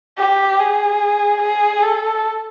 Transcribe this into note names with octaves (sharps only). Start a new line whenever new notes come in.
G4
G#4
G#4
A4